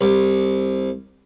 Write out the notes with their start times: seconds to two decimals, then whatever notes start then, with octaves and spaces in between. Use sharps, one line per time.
0.01 C2